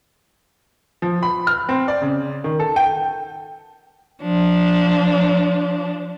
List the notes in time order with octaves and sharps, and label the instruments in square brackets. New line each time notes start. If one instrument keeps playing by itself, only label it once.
[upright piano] F3
B5
F6
C4
D5
C#3
D#3
A4
G5
[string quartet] F3 D4